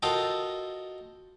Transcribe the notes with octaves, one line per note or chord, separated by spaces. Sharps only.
F4 F#4 A4 A#4 D#5 G5